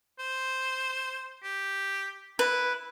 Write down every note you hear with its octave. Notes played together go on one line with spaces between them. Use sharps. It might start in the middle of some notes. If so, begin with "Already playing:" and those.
C5
G4
E4 B4